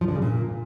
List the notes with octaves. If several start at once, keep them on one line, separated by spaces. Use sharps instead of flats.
F3
D3
C#3
A#2